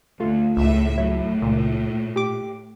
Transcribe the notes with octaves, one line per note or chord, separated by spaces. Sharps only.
D2 A3 F4
C#2 A2 E5
A2 F#3 E4
C#2 A#2
G4 D6